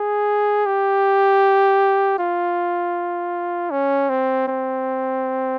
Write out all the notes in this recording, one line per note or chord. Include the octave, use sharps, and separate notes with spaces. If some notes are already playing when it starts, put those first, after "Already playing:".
Already playing: G#4
G4
F4
C#4
C4
C4